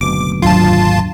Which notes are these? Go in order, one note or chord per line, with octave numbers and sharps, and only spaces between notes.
F#1 D2 B2 D6
G#1 D#2 F#3 D4 F4 A5